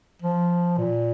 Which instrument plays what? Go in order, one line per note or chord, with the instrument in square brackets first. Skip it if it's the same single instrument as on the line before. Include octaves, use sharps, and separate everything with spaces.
[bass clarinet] F3
A#2